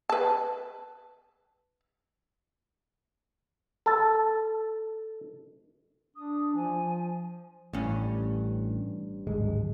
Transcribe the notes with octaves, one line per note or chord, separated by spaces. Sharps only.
B4 A5
A4 A5
D4 D#6
F3 G#5
A1 G2 C#4
D1 G#1 G#3